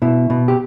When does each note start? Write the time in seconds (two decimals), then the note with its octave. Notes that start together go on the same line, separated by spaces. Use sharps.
0.02 B2 E4
0.30 B2
0.48 G4